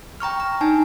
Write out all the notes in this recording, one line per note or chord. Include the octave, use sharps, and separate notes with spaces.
G5 A#5 C#6 F6
A#5
D4 D#4 G#5 A5